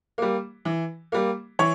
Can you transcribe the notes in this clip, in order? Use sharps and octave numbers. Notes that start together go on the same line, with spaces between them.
G3 A#3
E3
G3 A#3
E3 C#5